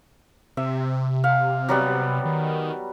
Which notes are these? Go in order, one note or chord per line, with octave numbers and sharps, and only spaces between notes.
C3 E5
F5
F#3 G3 B3
D#3